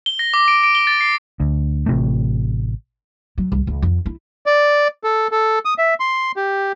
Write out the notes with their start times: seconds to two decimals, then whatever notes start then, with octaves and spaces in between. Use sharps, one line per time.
0.06 G7
0.19 A#6
0.34 D6
0.48 D7
0.64 D7
0.75 G7
0.87 A6
1.01 C7
1.40 D2
1.86 A1 C3 A3
3.38 F#3
3.52 C2
3.67 C#2
3.82 F2
4.06 E4
4.46 D5
5.04 A4
5.31 A4
5.65 D#6
5.78 E5
6.00 C6
6.36 G4